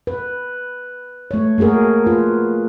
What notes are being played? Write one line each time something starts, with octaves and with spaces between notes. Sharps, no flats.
B4
A3 C#5
A3 A#3 F#4 G#4 A#4
F4 B4